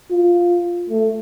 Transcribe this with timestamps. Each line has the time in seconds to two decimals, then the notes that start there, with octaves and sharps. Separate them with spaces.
0.11 F4
0.90 A3